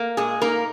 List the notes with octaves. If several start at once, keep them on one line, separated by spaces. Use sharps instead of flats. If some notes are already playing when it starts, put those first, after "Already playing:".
Already playing: A#3
A#2 G#3 G#4
A#3 D#4 A#4